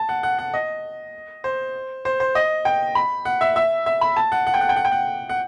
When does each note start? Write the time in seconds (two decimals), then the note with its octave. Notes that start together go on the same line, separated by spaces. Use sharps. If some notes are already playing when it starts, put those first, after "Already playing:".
Already playing: A5
0.09 F#5
0.23 F#5
0.39 F#5
0.54 D#5
1.44 C5
2.05 C5
2.20 C5
2.35 D#5
2.65 G5
2.95 B5
3.25 F#5
3.41 E5
3.56 E5
3.86 E5
4.01 B5
4.16 A5
4.32 F#5
4.47 F#5
4.54 G5
4.61 F#5
4.69 G5
4.76 F#5
4.85 G5
4.92 F#5
5.29 F#5